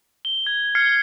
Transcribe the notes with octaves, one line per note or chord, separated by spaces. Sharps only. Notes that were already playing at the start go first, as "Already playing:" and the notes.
G7
G#6
F6 G#6 C7 C#7